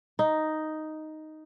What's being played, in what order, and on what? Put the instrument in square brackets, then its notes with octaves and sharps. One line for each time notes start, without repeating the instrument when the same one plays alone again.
[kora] D#4